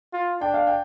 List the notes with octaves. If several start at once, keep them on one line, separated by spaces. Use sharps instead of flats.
F4
D4 G5
F5
G5